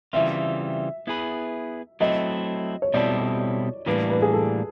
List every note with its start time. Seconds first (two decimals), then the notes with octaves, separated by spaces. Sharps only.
0.13 C#3 E3 G3 C4 F4 E5
1.07 B3 E4 G#4 B4
2.00 F#3 A3 C4 E4 D#5
2.82 C#5
2.94 B2 G3 C4 E4 A4 D5
3.86 A2 E3 G3 A#3 D4 B4
4.10 B4
4.22 G#4
4.33 A4